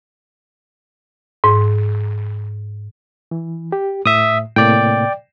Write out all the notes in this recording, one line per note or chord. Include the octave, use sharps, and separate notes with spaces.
G#2
E3
G4
A2 E5 D#6
A2 C3 A#3 D5 G5